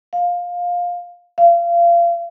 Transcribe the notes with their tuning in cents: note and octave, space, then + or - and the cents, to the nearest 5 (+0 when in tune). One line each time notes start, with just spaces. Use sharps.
F5 +15
F5 -30